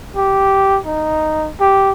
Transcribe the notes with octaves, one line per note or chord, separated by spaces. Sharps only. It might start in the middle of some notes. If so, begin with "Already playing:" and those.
G4
D#4
G4